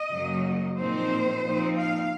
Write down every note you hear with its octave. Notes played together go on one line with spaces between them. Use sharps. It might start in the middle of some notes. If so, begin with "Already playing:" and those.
Already playing: D#5
F#2 C#3 F#3 A#3
A#2 F3 C4 D#4 C5
A#2 F3 C4 D#4
F5